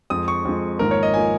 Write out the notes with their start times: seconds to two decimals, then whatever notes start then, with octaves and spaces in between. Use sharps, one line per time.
0.10 F2 F3 G#3 D#6
0.28 C#6
0.45 F2 F3 G#3
0.79 G#1 G#2 F3 A#3 A#4
0.91 C#5
1.03 D#5
1.14 F3 A#3 G#5